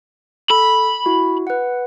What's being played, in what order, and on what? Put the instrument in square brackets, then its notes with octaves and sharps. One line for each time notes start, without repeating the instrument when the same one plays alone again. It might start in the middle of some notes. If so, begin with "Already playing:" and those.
[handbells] A4 [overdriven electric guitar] B5
[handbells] E4 F#4
B4 F#5